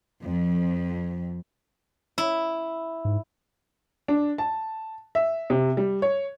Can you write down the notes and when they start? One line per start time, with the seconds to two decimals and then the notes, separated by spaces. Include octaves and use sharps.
0.23 F2
2.18 E4
3.05 G#2
4.08 D4
4.38 A5
5.15 E5
5.50 C3
5.77 G3
6.02 C#5